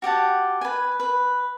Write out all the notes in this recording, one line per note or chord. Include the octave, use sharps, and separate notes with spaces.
F#4 G4 F#5 A5
B4 G#5
B4